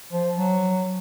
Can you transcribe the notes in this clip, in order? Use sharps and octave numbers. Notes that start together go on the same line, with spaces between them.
F3
F#3